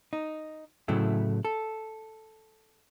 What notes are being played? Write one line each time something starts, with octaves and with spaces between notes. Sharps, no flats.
D#4
A2 C#3 F#3 A3 E4
A4